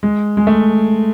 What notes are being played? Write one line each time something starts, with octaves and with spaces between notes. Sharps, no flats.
G#3
G#3
A3